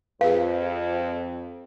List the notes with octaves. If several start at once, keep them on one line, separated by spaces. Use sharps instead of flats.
F2 G#4 B4 F5